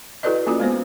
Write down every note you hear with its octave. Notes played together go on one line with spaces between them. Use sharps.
E4 F#4 A4 B4 D5 D#5
A#3 C#4 F4 F#4
G#3 B3 C5